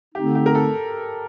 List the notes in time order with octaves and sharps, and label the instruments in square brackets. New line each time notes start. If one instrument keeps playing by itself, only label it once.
[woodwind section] D3 A3 C4 D#4 [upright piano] G4
[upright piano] G4
A#4
A4